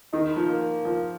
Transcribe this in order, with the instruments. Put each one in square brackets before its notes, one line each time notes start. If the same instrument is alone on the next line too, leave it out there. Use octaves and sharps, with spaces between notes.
[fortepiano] D#3 [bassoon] D#4
[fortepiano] F3
[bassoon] A#3
[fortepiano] F3